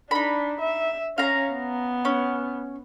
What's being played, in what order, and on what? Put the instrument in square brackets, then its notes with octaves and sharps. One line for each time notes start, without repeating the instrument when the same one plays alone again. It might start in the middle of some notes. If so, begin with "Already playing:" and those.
[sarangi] D4 [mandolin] D#4 B5
[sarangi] E5
[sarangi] C#4 [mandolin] F5 A#5
[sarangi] B3
[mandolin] C#4